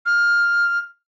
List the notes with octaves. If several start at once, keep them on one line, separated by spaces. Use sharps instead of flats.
F6